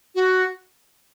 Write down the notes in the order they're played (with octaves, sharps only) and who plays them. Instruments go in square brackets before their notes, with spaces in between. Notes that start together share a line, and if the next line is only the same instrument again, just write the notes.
[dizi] F#4